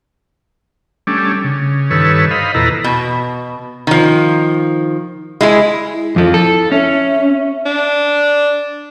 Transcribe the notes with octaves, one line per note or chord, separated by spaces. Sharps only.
G3 A3 C#4 D4
C#3
G2 D#3 A4 B4 C#5 E6
C5 D#5 F5 B5
E2 A#2 E4 A4 B4 A#5
B2
D#3 F3
G#3 E4 G#4
E4
F2 F3 A4
E4 A4
C#4 E5
D4